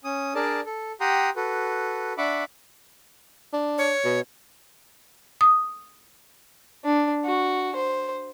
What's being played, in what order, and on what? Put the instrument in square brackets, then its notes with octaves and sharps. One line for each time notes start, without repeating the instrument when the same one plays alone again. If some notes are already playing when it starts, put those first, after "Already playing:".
[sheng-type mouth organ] C#4 D#6
D4 G#4 A#4 D5 A5
A4
G4 F#5 G5 A#5 C6 D#6
F#4 A4 B4
D4 E5 F#5 B5 C#6 D6
[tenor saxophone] D4
[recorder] C#5
[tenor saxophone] B2
[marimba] D#6
[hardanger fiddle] D4
F#4
C5